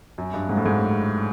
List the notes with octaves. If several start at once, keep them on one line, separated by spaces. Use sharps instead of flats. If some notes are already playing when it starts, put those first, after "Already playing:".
F#2
G2
G#2
A2
G#2